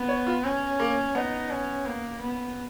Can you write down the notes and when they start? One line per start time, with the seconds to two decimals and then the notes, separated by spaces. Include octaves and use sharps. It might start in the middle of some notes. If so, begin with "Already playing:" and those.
Already playing: B3
0.09 C#5
0.27 F4
0.44 C#4
0.80 A#3
1.15 B3 D#4
1.50 C#4
1.86 A#3
2.21 B3